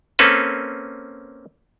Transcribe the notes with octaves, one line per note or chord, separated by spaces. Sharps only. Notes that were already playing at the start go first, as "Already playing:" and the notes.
A#3 C4 C#4 A4 B4